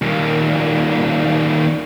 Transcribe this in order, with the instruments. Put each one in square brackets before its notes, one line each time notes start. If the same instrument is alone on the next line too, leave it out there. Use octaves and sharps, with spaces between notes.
[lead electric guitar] D#2 A#2